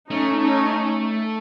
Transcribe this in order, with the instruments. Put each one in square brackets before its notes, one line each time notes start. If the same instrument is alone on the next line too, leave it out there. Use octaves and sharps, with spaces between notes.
[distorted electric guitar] A3 [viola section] C#4 D#4
[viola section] C#4 D#4